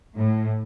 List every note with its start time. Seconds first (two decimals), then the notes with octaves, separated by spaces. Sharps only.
0.15 A2